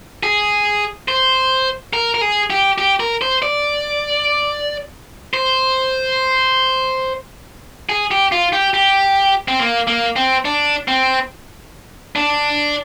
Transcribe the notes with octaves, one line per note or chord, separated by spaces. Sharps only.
G#4
C5
A#4
A#4
G#4
G4
G4
A#4
C5
D5
C5
G#4
G4
F4
G4
G4
C4
A#3
A#3
C4
D4
C4
D4